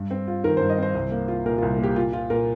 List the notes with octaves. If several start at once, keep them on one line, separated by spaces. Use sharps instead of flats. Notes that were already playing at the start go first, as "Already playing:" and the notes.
Already playing: G2
C4
F4
D#3 A#4
C5
G2
D#5
C4 C5
C2
A#3
F4
A#2 A#4
F4
C2
A#3 G4
A#2 F4
F4
A#2 A#4